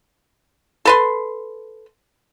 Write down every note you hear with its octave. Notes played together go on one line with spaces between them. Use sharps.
A4 B4 C6